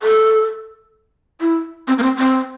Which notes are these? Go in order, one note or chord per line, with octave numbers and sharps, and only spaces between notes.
A4
E4
C4
A#3
C4
C4